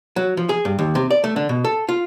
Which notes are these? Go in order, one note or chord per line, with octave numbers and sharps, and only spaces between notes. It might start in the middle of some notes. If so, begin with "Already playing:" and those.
F#3
F3
G#4
G2
D#2
C3
D5
A3
D3
B2
A4
F4